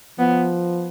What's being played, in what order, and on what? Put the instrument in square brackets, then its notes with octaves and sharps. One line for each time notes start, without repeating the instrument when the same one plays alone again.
[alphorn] F3 [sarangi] B3